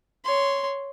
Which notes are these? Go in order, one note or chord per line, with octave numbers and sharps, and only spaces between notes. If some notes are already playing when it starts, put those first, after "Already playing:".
C#5 C6